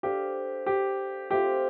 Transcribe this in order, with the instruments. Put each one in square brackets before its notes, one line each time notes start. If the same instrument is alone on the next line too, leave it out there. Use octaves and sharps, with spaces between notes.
[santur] D4 A4 C5 F5 [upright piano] G4
[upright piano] G4
[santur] A3 C4 F4 [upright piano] G4